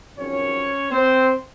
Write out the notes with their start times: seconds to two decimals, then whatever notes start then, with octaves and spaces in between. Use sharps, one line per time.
0.17 G#1 F#2 F3 C4 C#4 C#5
0.91 C4 C5